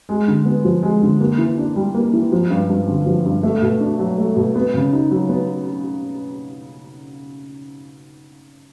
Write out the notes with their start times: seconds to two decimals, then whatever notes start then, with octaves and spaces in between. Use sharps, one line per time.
0.09 G#3
0.27 D3
0.46 B3
0.64 F3
0.83 G#3
1.02 D3
1.20 A#3
1.38 E3
1.58 D4
1.76 G3
1.94 A#3
2.13 E3
2.32 F3
2.51 G2
2.69 G2
2.88 D3
3.06 F3
3.25 G2
3.43 A3
3.62 B2
3.80 D4
3.99 F#3
4.18 A3
4.36 B2
4.55 B3
4.74 C#3
4.93 D#4
5.11 F#3
5.29 B3